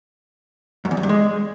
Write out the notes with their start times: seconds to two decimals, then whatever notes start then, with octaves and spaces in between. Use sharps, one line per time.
0.85 F#2
0.91 E2
0.97 F#2
1.03 G2
1.09 G#3